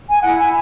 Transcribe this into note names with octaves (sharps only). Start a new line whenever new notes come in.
G#5
E4 F#5
G#5